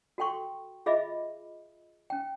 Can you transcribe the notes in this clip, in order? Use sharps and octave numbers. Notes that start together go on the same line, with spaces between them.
F#4 A4 G5 C6 C#6
F4 G#4 D#5 E5 B5 D6
C#4 G5